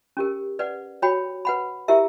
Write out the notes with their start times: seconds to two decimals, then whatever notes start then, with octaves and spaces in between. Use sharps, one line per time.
0.17 C#4 G4 A#4
0.59 B4 D5 F#5
1.02 F#4 C#5 G5 B5
1.45 B4 F#5 B5
1.88 E4 G4 A#4 E5